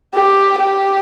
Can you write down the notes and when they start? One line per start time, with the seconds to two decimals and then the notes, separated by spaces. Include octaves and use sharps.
0.14 G4
0.60 G4